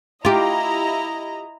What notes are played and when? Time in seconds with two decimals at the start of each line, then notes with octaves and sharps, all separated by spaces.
0.25 E4 F4 G4 D#5 A#5